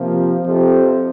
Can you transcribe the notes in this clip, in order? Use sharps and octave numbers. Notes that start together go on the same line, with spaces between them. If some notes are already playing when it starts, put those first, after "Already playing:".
Already playing: C3 F3 A#3
F2 C3 F3